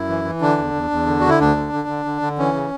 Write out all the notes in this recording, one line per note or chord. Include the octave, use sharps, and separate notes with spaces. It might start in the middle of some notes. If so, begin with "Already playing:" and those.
Already playing: F#2 E4
E3
E3
D3 D4
E2
E2
E2
D3
D3 F#4
E4
D2 D4
D3
D3
D3
D3
D3
E3 C#4
C#3